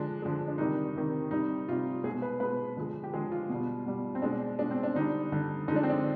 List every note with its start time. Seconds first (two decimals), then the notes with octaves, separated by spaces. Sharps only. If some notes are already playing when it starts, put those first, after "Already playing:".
Already playing: D3 F3 G#3 D4
0.22 D3 F3 G#3
0.48 D4
0.58 C3 D#3 G3 D#4
0.96 C3 D#3 G3
1.31 C3 G3 D#4
1.68 C3 G3 F4
2.04 B2 G#4
2.08 G#3
2.22 B4
2.40 B2 G#3 B4
2.76 D3 F3 G#3
3.04 G4
3.14 D3 F3 G#3 G#4
3.32 F4
3.49 B2 G3
3.86 B2 G3
4.15 C4
4.22 B2 G#3 D4
4.59 B2 G#3 D4
4.71 C4
4.83 D4
4.96 D3 G3 D#4
5.32 D3 G3
5.68 D3 F3 G#3 D#4
5.76 D4
5.83 C4
5.89 D4